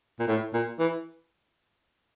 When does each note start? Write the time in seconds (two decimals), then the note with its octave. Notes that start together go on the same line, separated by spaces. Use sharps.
0.20 A#2
0.28 A2
0.54 A#2
0.79 E3